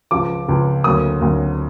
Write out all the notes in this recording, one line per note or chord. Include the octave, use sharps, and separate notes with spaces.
C#2 C#3 F3 D6
C#2 C#3 F3
D2 D3 F#3 A#3 D#6
D2 D3 F#3 A#3